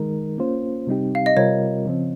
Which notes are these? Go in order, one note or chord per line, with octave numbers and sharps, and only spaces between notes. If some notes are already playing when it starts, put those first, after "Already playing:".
Already playing: D#3 G#3 D#4 A#4
A#3 C#4 F4 C5
C3 G3 C4 D#4 G4
F5
D#5
C3 G3 C4 F4 A#4 C#5
C#3 F3 C4